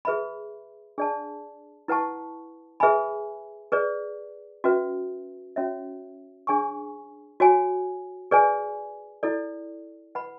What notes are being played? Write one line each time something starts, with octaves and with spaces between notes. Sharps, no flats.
G#4 B4 E5 B5
D4 G#4 D5 A5
E4 B4 F#5 A5 C#6
G#4 B4 E5 G#5 B5
G#4 B4 D5
C#4 F#4 B4 E5
C#4 F#4 C#5 E5
D4 G#4 C#5 G#5 C#6
F#4 C#5 G#5
G#4 B4 D5 G#5
E4 A4 D5
B4 F#5 B5